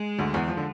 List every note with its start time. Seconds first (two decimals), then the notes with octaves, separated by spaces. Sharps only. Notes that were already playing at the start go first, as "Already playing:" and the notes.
Already playing: G#3
0.18 D2 D3
0.34 E2 E3
0.48 F3
0.57 D3